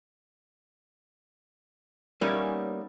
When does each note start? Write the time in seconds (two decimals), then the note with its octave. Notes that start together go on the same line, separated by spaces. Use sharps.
2.21 G3 A#3 B3 C#4 D#4 E5